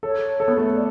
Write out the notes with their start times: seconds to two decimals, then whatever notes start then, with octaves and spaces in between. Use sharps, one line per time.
0.03 A4 C#5
0.40 A4
0.48 B3
0.57 A3
0.75 D5